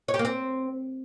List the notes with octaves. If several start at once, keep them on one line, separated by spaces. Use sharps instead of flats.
C#5
G4
A#3
C4